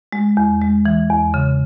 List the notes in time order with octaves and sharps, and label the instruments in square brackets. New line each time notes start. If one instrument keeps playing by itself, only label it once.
[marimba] G#3
E2
G#3
E3
E2
C#3